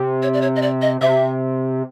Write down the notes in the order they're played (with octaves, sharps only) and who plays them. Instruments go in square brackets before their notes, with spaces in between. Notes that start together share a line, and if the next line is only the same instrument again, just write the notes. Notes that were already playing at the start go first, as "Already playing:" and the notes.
Already playing: [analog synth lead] C3
[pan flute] C#5
D5
C#5
D#5
D5
D#5
[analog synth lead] C3 [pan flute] E5